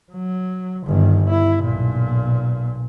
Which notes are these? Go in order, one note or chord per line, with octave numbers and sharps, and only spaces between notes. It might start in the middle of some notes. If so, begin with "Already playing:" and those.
F#3
G1 D#3
E4
B1 A#2